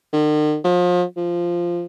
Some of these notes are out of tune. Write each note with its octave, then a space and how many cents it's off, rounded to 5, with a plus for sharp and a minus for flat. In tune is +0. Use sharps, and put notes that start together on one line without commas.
D#3 -45
F3 +35
F3 -5